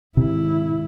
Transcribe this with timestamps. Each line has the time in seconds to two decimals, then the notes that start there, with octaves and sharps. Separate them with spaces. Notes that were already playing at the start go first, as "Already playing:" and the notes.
0.17 G#1 C3 E4